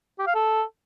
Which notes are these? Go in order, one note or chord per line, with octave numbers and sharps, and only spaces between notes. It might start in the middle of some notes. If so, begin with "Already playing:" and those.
G4
F5
A4